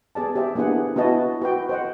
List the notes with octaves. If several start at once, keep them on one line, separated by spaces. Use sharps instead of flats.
B3 G#4 D5 A5
G4 C5 D5 E5
A#3 B3 D4 E4 G#4 F#5
B3 E4 F#4 D#5 A5
F#4 B4 G5
C5 D#5 F#5